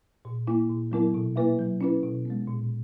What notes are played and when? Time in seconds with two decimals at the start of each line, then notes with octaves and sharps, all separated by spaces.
0.25 A#2
0.47 A#3 E4
0.70 A#2
0.92 F#3 B3 E4 A#4
1.14 B2
1.36 A#3 E4 B4 E5
1.59 F#3
1.81 C#4 E4 B4
2.03 B2
2.25 G#3 B3
2.47 A#2